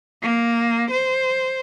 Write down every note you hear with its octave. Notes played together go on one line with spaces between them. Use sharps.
A#3
C5